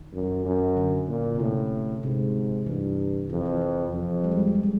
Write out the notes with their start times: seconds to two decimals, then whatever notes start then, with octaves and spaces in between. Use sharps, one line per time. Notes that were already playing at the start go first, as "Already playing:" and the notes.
Already playing: D#3
0.13 F#2
0.45 F#2
0.77 D3
1.08 A#2
1.35 C3
1.39 A2 C#3
2.03 G#2 C3
2.66 G2 E3
3.29 F2 E3
3.45 F3
3.61 F3
3.92 F2
4.24 G3
4.32 G#3
4.39 G3
4.47 G#3
4.55 G3
4.63 G#3